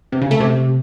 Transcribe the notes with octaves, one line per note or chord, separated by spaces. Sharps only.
C3
C#3
A3
C3